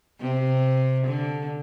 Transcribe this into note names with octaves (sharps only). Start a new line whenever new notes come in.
C3
D3